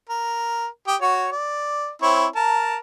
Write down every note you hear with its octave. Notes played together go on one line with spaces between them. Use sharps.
A#4
G4 G5 D#6
F#4 C#5
D5
C4 E4 C#5
A#4 A5